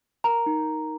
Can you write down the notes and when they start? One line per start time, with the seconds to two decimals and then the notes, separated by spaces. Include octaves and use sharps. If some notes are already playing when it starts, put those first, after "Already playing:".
0.24 A#4 A#5
0.46 D#4